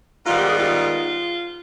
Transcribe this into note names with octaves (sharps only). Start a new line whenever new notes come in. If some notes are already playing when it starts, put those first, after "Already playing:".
G#2 D#3 G3 B3 F4
G4
F4 G#4
F4